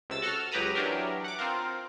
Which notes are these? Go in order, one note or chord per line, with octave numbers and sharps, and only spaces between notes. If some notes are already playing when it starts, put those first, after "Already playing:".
C#2 C3 E6 A6
F#4 A4 E6 F6
C#2 F#3 G4 B4 A#5 D#6
E3 F#3 D4 G4 A#4
F#5 D6
C4 F4 A#4